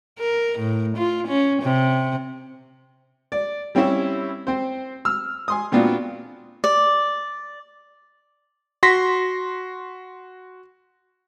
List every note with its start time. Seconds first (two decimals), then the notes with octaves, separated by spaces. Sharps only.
0.19 A#4
0.59 A2
0.97 F4
1.28 C#4
1.63 C3
3.32 D5
3.75 G3 C4 C#4 E4 E5
4.47 C4 C5
5.05 E6 F6
5.48 G#5 C6 D#6
5.72 A#2 B3 C4 D4 F4 F#4
6.64 D5
8.83 F#4 C6 A#6 B6